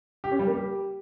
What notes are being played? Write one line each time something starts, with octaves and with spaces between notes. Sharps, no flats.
G4
C#4
G3
A#3
G4